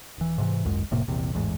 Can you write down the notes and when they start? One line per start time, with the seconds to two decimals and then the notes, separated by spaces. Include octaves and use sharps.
0.18 D#1 E3
0.38 G#2 C3 E3
0.64 G#1 C#2 F#2 G#3
0.91 F1 A2 C3 A#3
1.08 A#1 E2 C3
1.34 A1 E2 G#2